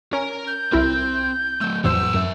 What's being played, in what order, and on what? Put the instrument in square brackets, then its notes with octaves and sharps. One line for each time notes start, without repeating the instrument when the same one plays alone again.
[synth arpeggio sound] C#4 [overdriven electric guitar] A#4 A#5
[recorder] G6
[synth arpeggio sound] C2 E4 A#4 [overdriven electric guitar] C4
[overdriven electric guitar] F#3 A3 [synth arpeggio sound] E6
[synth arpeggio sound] A1 F2 C5 [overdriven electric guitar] F#3 B3 [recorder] E6
[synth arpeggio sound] F#2 [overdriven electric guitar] A#4 E5